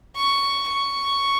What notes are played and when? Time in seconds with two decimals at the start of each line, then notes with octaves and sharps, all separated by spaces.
0.16 C#6
0.69 C#6